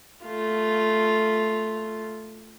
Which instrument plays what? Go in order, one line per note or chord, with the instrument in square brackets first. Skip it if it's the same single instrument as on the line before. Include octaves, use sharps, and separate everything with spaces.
[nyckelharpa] A3 F4